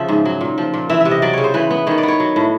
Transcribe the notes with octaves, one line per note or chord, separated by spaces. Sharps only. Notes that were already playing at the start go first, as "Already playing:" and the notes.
Already playing: C#3 F3 E5
G#2
F#3
A#2
F3
A#2
E3 E5
C3 E5
D#5
F#3 D5
C#3 C#5
C5
E3 B4
B3
D#3 C#5
D5
B3
C#5
F#3
A2